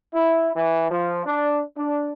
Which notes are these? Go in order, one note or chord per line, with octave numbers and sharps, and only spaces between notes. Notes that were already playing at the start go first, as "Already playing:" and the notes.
E4
E3
F3
D4
D4